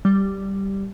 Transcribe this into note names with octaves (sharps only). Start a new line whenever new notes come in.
G3